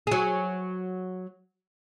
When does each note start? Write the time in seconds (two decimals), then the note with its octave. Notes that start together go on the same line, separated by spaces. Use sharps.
0.07 F#3 G#4